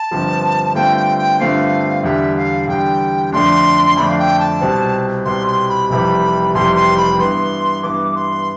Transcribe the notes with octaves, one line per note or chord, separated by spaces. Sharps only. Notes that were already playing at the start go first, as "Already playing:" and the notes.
Already playing: A5
G1 G2 F3 C4
G2 D3 A3 C4 F4 G5
G5
G5
G2 D3 A3 C4 F4 F5
E2 D3 G3 E5
F5
E2 D3 G3 G5
F2 D3 A3 D4 C6
F2 D3 A3 D4 B5
F5
G5
A5
C2 B2 G3 C4
C2 B2 G3 C4 C6
C6
B5
F1 F2 C3 E3 G3 B5
F1 F2 C3 E3 G3 C6
C6
B5
G2 E3 B3 C6
G2 E3 B3 D6
C6